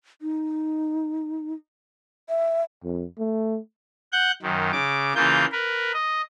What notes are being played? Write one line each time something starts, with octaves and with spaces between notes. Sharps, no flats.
D#4
E5
F2
A3
F#5 F#6 G6
F#2 D#3
C#3 D6
C#3 E3 A#3 F4 G6
A#4 B4
D#5